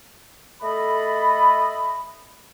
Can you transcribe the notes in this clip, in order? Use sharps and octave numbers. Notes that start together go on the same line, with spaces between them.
A3 A4 D#5 B5